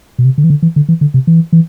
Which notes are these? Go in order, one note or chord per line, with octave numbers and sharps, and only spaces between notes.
B2
C3
D3
E3
D3
E3
D3
E3
D3
C3
E3
E3